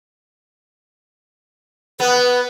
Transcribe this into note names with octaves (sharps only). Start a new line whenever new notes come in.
B3 B4